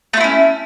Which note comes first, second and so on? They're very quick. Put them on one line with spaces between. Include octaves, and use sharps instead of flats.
A3 F4 E4 C#4